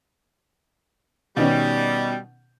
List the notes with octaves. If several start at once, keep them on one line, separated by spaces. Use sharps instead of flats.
B2 D#3 G3 C#4